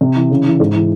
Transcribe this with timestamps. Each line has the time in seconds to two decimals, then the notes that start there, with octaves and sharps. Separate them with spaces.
0.01 C3
0.16 E3
0.30 C#3
0.46 E3
0.60 G#2
0.75 E3